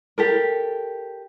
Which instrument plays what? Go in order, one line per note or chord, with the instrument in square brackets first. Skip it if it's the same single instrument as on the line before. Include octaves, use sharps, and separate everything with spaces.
[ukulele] G4 A4 A#4